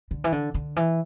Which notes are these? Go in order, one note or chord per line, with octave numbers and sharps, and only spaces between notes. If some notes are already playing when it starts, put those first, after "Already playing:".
D3
E3
D3
D3
E3